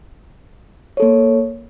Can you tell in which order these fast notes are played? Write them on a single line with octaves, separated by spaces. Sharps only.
C#5 A4 A#3